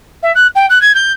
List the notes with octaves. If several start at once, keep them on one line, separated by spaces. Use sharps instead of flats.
E5
F#6
G5
F#6
G#6
G6